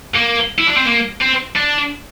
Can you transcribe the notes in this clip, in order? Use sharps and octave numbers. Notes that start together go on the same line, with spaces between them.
A#3
E4
D4
C4
A#3
C4
D4